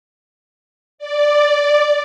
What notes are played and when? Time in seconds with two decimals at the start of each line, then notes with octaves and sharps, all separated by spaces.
0.98 D5